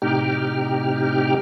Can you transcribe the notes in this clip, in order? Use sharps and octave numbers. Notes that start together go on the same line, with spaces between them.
A2 C3 D#4 G4 G5 F6